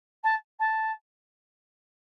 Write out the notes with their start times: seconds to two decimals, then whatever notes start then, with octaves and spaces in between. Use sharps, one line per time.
0.23 A5
0.59 A5